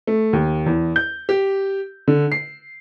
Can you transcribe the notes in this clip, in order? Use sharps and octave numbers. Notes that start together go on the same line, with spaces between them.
A3
D#2
E2
G6
G4
D3
C7